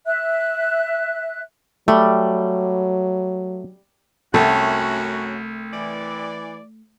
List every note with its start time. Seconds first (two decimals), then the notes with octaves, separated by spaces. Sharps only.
0.06 E5 F#6
1.88 F#3 G3 A3
4.34 C2 F#2 A3 C#4 F#4
5.74 E3 D5